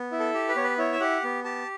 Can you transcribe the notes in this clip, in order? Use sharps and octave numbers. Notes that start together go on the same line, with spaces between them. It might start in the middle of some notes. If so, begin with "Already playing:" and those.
Already playing: B3
E4
A4
G4
B4
B3 C#5
B4
E4 C#5
E5
G4 F#5
B3
G4 A5